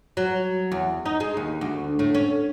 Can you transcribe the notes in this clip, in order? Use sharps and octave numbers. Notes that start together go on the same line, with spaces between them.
F#3
E2
D#4
G#3
D#2
D2
A2
C#4